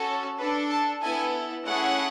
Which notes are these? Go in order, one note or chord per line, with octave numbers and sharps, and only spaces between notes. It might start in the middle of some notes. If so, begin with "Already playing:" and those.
Already playing: C#4 F#4 A4
D4 A4 B4
A5
B3 E4 A4 G#5
A3 C#4 E4 G#4 F#5